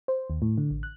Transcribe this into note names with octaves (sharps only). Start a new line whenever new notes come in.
C5
D#2
A2
D3
A1
F#6